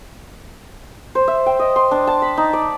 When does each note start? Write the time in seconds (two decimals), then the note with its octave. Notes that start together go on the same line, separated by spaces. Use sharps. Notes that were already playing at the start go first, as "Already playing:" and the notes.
1.15 C5
1.28 E5
1.46 G5
1.59 D#5
1.76 C6
1.91 D4
2.07 A5
2.22 B5
2.37 D#4
2.53 D5